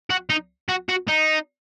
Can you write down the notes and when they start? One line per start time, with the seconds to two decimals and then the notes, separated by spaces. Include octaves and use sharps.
0.10 F#4
0.30 D#4
0.69 F#4
0.89 F#4
1.08 D#4